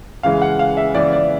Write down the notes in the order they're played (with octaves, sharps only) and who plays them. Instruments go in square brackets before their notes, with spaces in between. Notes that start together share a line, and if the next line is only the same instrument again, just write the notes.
[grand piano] C#3 E3 G#3 F5
F#5
F5
E5
C#3 E3 G#3 D5
D5